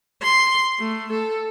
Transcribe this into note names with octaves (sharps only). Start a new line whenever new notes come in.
C6
A3
A4